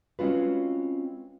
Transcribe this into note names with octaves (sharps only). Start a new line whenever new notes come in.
G#3 C4 C#4 F4 F#4 B4